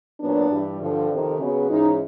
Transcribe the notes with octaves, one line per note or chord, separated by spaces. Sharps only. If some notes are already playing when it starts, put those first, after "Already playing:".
A#2 F#3 B3 D4
G2 E3 G3
G2 D3 F3
F2 C3 D#3
C#3 F#3 B3
G#2 E3 G#3 C#4 D#4